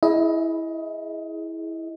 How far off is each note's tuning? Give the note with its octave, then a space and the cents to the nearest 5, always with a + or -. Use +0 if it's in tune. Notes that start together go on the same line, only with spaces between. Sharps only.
E4 -10 G#4 +5 D#5 +20